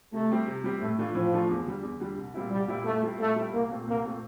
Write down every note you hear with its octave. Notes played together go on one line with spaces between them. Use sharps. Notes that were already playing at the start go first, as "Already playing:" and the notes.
C3 A3
G3 C4 G4
C3
G3 C4 G4
A2 A3
E3 A3 D4 F4
A2 F3
E3 A3 D4 F4
E2
D3 G3
E2
D3 G3
C2
A#2 G3 C4 E4
C2 G3
A#2 G3 C4 E4
A#2 A3
G3 C4 E4
A#2 A3
G3 C4 E4
C2 A#3
A#2 A3 C4
C2 A#3
A#2 A3 C4